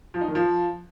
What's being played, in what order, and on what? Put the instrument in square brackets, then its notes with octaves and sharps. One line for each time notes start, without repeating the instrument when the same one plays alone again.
[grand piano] F3
D#4
D#3
F3